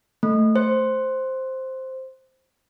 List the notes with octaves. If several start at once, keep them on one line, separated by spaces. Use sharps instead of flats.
A3
C5